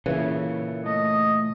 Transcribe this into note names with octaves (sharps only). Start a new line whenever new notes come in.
A#2 C#3 E3 A4 C#5 E5
A3 D#5